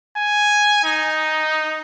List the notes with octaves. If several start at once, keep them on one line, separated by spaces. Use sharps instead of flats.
G#5
D#4